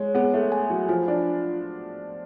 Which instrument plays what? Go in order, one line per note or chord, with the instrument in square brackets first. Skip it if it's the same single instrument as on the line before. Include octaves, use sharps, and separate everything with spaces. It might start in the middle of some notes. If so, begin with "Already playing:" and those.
Already playing: [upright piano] G#3 [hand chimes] C#5
[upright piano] B3 [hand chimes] G#4
[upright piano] A3
[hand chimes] G#5
[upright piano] F#3
[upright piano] F3 [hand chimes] F4
[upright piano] D4